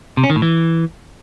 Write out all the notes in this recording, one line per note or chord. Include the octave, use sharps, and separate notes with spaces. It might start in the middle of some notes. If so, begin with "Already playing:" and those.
C3
C#4
D#3
A2
E3